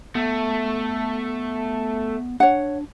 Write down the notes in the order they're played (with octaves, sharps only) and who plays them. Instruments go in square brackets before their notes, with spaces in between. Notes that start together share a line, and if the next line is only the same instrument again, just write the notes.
[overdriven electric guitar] A3 [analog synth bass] B3
[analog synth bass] D4 [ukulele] C#5 F#5